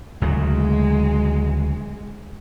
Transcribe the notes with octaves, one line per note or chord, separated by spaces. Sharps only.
D2 C#3 F#3 G#3